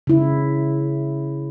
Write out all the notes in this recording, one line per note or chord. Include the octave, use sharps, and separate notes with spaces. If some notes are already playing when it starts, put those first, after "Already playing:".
C#3 E4